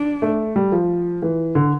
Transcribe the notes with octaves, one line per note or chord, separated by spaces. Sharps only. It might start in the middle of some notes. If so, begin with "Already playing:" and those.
Already playing: D4
A3
G3
F3
E3
D3